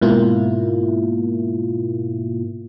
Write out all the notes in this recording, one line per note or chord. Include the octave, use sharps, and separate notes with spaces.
G#2 B2 A#3 E4 F4